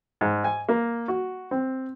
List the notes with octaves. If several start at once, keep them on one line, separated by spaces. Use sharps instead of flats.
G#2
G#5
A#3
F#4
C4